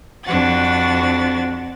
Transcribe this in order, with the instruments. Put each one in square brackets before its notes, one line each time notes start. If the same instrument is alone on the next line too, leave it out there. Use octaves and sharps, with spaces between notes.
[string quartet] F2 D4 F#4 A6